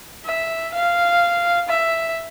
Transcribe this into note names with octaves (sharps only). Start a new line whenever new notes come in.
E5
F5
E5